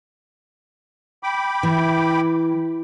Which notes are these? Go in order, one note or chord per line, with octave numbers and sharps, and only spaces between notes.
G5 B5 D6
E3